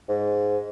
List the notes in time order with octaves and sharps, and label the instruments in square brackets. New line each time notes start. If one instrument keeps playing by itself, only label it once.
[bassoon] G#2